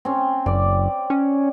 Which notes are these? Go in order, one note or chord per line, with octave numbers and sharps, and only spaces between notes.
C4 C#4
F#1 D5
C#4